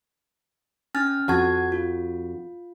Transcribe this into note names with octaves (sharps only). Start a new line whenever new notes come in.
C#4 G#5 F6 A6
F2 F#4 F#5 A5 G#6
F4